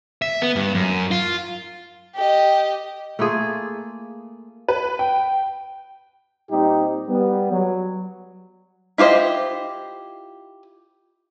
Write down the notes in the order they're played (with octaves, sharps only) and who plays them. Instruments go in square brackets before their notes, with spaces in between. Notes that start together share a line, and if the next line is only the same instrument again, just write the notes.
[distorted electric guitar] E5
B3
G2
F#2
F4
[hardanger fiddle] G4 D#5
[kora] A3 A#3 F4 G#4
[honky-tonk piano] B4
G5
[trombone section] A#2 G3 C4 D#4 G4
G3 B3
F#3
[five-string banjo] E4 F4 G4 C5 D#5